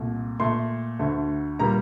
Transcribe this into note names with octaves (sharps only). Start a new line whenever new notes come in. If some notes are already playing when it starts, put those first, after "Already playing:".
Already playing: C2 A#2 A3
A#2 A3 C6
D2 D3 A3
A#2 G3 A#3 A#5